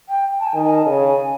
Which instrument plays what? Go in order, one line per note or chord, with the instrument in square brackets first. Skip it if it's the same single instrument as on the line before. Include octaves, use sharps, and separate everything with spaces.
[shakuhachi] G5
A5
G5
[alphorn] D#3 [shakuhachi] G#5
[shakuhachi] G#5
A5
[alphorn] C#3 [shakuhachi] G#5